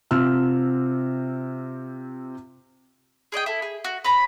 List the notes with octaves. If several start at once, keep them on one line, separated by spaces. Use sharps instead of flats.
C3 C4 F4 E6 F6
G#4 D5 D#5 G5
E4 A4
G#4
F#4
B4 C#5 A#5 B5